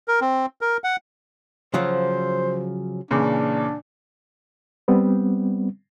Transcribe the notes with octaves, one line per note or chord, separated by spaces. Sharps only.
A#4
C4
A#4
F#5
C#3 F3 F#3 C5
A#2 C#3 E3 D4
G3 B3 C4